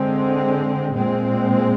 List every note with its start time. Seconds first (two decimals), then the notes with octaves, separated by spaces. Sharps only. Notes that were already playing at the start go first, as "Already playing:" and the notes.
Already playing: D3 G#3 C4
0.93 A#2 G#3 C4